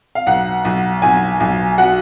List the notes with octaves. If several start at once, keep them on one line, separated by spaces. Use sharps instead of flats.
F5
B1 F#5
B1
B1 G#5
B1
F#3 F#5